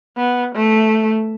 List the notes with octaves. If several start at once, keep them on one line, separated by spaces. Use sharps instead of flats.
B3
A3